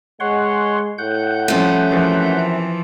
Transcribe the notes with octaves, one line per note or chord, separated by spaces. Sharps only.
G#3 C#5 F#5 C6
A2 F#5 G6
F3 G3 A3 C#4
F#2 C3 E3 F3